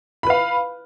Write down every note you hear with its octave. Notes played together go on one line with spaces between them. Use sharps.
B4 F5 B5